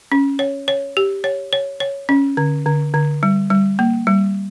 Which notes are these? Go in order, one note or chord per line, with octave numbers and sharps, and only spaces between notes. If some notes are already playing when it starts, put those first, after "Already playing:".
C#4
C#5
C#5
G4
C#5
C#5
C#5
C#4
D3
D3
D3
G3
G3
A#3
G3